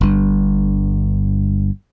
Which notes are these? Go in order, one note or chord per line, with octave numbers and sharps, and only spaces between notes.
G1 G2